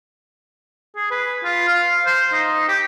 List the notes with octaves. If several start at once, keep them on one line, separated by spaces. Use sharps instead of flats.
G#4
B4
F4
F5
C5
D#4
G4